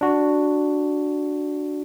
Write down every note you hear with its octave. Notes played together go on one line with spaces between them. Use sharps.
D4 F#4